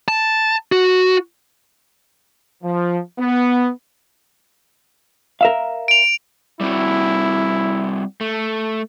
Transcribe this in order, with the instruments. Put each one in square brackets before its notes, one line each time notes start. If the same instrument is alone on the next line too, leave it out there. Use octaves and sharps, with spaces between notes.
[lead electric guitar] A5
F#4
[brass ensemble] F3
B3
[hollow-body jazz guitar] A#4 E5 F5
[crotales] D7 F7
[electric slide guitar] G3 C4 F#4 [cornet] E4
[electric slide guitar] A3